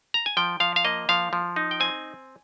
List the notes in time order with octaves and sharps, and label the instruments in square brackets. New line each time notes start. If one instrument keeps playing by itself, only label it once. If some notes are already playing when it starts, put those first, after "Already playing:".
[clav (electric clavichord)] A#5
G#5
F3 G5
F3 F5
F5
A#3 D#5
F3 F5
F3
D#4
G5
C4 G#5